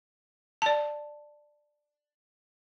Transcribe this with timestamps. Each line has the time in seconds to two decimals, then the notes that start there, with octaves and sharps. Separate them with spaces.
0.62 D5 A5